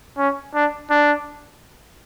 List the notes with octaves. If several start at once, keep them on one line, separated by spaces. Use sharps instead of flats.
C#4
D4
D4